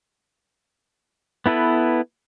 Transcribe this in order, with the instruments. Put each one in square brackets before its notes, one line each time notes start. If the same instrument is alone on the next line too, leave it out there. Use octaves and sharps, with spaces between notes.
[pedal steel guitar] B3 E4 A4 B4